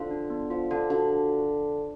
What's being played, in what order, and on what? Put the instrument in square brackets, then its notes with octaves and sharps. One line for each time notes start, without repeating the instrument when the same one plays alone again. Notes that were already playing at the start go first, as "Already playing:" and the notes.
Already playing: [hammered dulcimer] D3 F3 [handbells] F4
[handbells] D4
B3
[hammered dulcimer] F3 [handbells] F4
[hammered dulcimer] D3 [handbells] D4
[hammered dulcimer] D3 [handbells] F#4